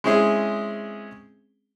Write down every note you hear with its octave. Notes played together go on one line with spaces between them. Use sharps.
G#3 C4 C#4 E4 G#4